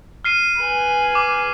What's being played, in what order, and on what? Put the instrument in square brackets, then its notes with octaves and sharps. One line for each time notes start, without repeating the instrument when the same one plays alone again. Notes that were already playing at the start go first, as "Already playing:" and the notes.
[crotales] F6 C7 D#7
[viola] B4 G#5
[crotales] D6